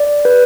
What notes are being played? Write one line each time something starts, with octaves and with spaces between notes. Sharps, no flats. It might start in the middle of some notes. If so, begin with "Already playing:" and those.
Already playing: D5
B4